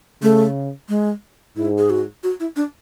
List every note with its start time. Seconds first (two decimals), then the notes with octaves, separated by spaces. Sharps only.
0.23 C#3 A3
0.89 G#3
1.56 G#2 E4
1.78 G#4
1.90 F#4
2.23 F#4
2.40 E4
2.56 D4